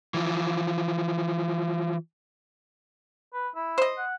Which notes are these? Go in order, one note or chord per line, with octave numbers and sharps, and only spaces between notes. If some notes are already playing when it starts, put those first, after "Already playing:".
E3 F3
B4
E4
C5 D#5
F#5